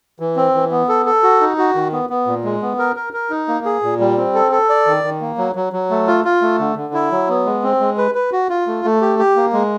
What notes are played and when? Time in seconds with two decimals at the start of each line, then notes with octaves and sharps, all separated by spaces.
0.20 E3
0.37 C4
0.55 E3
0.71 B3
0.89 A4
1.06 A4
1.23 F#4
1.41 D#4
1.58 F#4
1.75 D#3
1.92 B3
2.10 B3
2.27 A#2
2.44 G#3
2.62 B3
2.79 A#4
2.96 A#4
3.13 A#4
3.30 D#4
3.48 A#3
3.65 G#4
3.83 A#2
4.00 G3
4.17 C4
4.34 A4
4.52 A4
4.69 D5
4.86 D#3
5.04 D#3
5.21 A#3
5.38 F#3
5.56 F#3
5.73 F#3
5.90 A3
6.07 F4
6.24 F4
6.42 A3
6.59 D3
6.76 D3
6.94 E4
7.12 F#3
7.29 B3
7.45 G#3
7.63 C4
7.80 G#3
7.98 B4
8.15 B4
8.32 F#4
8.50 F4
8.67 A3
8.85 A3
9.01 G4
9.19 G4
9.36 A#3
9.53 G#3